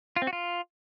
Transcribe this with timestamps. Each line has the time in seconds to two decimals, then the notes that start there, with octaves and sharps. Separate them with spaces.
0.16 F4
0.22 C4
0.27 F#4
0.33 F4